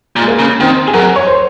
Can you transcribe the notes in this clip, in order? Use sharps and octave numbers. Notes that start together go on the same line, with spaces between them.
A#2
G#3
A#3
C#3
D#3 C4
G#4
F#3 A#4
C#5
C5